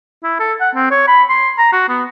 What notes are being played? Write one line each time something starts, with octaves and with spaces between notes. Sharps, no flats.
E4
A4
F#5
C4
C#5
B5
C6
A#5
F#4
B3